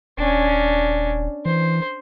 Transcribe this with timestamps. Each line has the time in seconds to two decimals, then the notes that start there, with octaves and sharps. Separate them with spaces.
0.18 D#1 C#4 D4
1.45 E3 C5